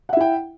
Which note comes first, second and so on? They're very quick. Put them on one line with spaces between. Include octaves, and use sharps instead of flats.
F#5 E5 E4 G5